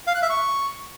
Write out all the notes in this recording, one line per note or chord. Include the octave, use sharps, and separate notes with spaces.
F5
F#6
E5
C#6